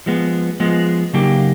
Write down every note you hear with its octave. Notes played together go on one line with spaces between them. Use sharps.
F3 G#3 B3
F3 G#3 B3
C#3 F#3 A#3 D#4 G4